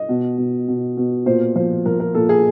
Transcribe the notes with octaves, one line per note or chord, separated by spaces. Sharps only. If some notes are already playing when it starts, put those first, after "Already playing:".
Already playing: D#5
B2
B2
B2
B2
A#2 C5
F3 C5
F3 A#4
A#4
A#2 A4
G#4